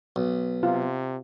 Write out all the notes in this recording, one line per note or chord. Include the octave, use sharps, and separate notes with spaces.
B1
C3 F4